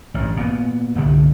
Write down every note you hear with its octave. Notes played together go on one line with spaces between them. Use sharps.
A1 G2
A#2 B3
G1 C2 D3 G3